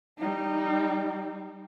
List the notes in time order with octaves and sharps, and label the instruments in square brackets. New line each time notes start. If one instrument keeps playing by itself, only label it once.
[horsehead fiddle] G3 D#4